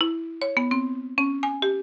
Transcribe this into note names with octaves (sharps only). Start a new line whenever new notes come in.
E4
C#5
B3
C4
C#4
G#5
G4